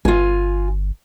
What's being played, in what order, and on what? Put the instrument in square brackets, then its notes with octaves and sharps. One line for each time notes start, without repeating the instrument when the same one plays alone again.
[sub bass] G1 [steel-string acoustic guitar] F4 G#5